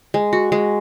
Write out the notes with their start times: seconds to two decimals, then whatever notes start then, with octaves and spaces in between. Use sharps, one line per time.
0.14 G#3
0.33 F#4
0.52 G#3